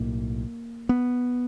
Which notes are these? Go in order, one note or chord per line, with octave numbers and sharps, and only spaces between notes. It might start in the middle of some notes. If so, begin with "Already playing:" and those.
Already playing: B1 A2 A#3
B3